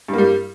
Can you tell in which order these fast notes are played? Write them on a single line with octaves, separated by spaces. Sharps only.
G2 A#3 G3